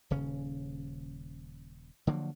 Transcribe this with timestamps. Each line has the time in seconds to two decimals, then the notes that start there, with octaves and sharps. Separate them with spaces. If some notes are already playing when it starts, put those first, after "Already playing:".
0.10 D#1 C#3 C#4
2.07 D3 F3 F#3 A#3